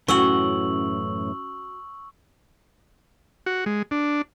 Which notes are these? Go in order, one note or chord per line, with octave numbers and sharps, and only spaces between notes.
F#2 A2 E3 C#4 F#4 C#6 E6 F#7
F#4
G#3
D4